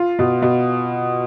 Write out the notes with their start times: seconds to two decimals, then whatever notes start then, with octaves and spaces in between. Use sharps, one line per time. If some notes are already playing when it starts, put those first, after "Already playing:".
Already playing: F4
0.19 B2
0.42 B2